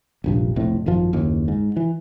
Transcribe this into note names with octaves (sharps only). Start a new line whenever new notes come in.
F1 A#1 G2
F1 B1 F2 A2
G#1 F#2 F3
F#1 D#2
G#2
E3